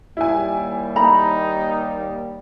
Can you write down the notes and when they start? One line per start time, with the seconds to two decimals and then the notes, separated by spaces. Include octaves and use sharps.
0.17 D#2 G3 E4 G#5
0.96 D#4 A#5 B5